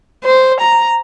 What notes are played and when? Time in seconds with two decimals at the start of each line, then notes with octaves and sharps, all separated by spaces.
0.24 C5
0.61 A#5